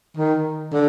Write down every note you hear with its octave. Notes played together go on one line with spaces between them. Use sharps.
D#3
D3